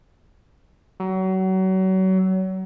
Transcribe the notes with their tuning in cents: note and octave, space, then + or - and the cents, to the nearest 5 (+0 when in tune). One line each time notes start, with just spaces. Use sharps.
F#3 +30